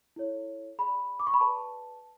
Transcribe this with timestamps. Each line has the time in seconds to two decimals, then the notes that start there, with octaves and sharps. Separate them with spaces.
0.16 E4 A4 C#5
0.79 G#4 D5 B5
1.20 D6
1.27 C#6
1.34 B5
1.40 G#4 B4 D5 A5